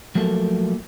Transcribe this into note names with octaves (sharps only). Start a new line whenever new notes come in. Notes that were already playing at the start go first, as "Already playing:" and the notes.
F3 F#3 A3 A#3 A4